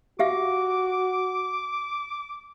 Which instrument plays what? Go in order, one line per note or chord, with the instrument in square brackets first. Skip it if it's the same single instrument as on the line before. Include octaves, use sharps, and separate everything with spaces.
[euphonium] F#4 [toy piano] G4 E5 F5 [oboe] D6